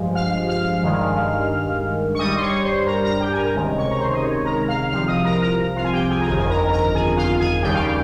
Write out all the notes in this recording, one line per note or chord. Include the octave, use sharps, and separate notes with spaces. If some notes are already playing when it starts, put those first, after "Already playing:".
Already playing: G2 F3 G#3
F5 F6
F5 F6
G2 D#3 G#3
C#6
G2 G3 D#5 D#6
C6
C#5 C#6
C5 C6
A#4 A#5
A#4 A#5
G4 G5
G#5
A#4 A#5
C#2 C3 D#3 G#3
C#5 C#6
A#5
C5 C6
D#5
C#5
A#4 A#5
F5 F6
C2 C3 F3 F5 F6
D#5 D#6
A#4 A#5
A#4 A#5
F4 F5
G#5
G4 G5
G#4 G#5
A#5
G1 F2 D#3 G#4 G#5
G#5
A#4 A#5
A#4 A#5
G#4 G#5
F4 F5
G#4 G#5
D#2 C#3 G3 G4 G5
F5
G4 G5